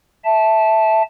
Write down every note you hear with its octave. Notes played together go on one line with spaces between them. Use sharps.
E5 A5